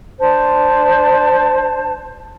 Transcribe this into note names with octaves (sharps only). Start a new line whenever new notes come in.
D4 C5 A5